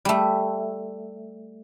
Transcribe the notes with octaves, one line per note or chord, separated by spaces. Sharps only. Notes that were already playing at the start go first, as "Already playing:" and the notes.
G3 A3